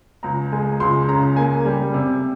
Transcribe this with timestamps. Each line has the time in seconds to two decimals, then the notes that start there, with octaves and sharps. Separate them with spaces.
0.23 C#2 A#5
0.52 G#3 G#5
0.80 C#2 C6
1.08 C#3 A#5
1.36 A#3 G#5
1.65 G3
1.94 C3